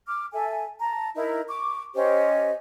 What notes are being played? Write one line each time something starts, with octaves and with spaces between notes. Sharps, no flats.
D6 F6
A4 E5 G#5
A5 A#5
D#4 E4 A#4
C#6 D6
C#4 G4 C5 D#5